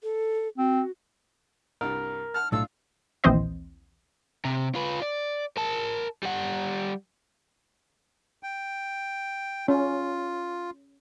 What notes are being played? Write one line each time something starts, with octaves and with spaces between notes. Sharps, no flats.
A4
C4 F#4
C2 G2 G3 A#4
F#5 A5 F6
B1 A2 D4 F4 A4 E6
A#1 D#2 E3 C4 C5 D#5
C3
F4 B4
D5
A#4 A5
G3 F#5
G5
C#4 F4